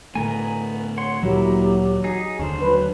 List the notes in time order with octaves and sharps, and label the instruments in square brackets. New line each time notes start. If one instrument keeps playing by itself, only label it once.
[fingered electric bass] A2 D3 A3 [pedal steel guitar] B3 A#4 G#5
[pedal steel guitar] C#5 F#5 C6
[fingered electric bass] D2 A#2 E3 [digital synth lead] F#3 [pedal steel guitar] A#3 E4 [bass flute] G4
[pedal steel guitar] D#4 G#4
[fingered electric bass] D#2 D3 [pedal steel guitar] C#4 D4 C5
[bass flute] F#3 [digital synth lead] B4